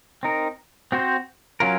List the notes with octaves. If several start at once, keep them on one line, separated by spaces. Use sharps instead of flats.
C4 D#4 A#4
C4 F#4 C5
F#3 C#4 F4 A#4